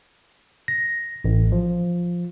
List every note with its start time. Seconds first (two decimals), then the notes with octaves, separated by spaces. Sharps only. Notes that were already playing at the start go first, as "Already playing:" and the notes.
0.68 A#6
1.24 A1
1.52 F3